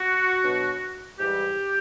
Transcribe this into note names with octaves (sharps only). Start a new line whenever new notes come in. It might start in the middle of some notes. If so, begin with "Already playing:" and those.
Already playing: F#4
B2 F#3 B3 D4
G#2 E3 G3 G4